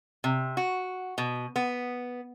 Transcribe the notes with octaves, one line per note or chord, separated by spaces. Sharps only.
C3
F#4
B2
B3